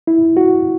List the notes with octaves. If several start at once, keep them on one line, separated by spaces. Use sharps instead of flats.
E4
F#4